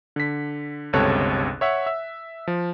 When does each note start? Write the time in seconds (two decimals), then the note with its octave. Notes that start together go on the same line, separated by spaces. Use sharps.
0.16 D3 B6
0.93 G1 C#2 C3 A4 C#5 F#6
1.61 C#5 E5 F#5
1.86 E5
2.47 F3